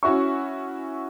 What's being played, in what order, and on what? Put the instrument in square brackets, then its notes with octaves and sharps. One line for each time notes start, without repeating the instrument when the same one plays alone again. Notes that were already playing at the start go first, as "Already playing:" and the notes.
[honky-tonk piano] C#4 E4 F#4 E5 C#6